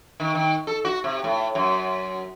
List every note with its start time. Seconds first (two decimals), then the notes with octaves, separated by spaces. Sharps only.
0.20 D#3
0.35 D#3
0.67 A4
0.85 F#4
1.04 C3
1.24 A2
1.55 F#2